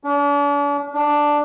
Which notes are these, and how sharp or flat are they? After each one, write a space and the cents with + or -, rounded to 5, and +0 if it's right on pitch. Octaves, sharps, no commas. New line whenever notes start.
D4 -45
D4 +0